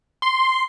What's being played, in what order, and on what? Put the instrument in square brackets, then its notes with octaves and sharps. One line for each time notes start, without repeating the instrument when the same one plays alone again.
[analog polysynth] C6